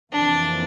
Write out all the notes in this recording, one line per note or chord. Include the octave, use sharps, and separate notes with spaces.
F2 C3 E3 A#3 D4